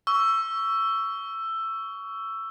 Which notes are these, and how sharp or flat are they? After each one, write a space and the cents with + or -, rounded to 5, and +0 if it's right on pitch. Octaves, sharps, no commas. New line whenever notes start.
C#6 +20 E6 +10